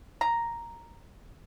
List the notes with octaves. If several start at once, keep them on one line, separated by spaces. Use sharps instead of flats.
A#5